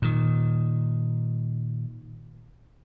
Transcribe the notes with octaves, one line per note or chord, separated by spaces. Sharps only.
A#2 D#3